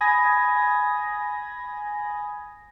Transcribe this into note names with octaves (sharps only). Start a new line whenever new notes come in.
G#5 B5 D#6 G#6 A#6